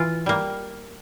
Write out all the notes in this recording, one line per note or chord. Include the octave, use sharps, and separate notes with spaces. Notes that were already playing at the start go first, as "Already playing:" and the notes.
Already playing: E3 F4
G3 A#3